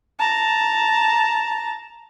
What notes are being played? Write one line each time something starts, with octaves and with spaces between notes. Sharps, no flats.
A5 A#5